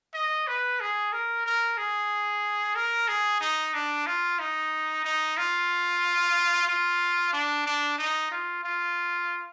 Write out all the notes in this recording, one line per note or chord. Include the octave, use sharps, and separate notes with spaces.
D#5
B4
G#4
A#4
A#4
G#4
A#4
G#4
D#4
D4
F4
D#4
D#4
F4
F4
D4
D4
D#4
F4
F4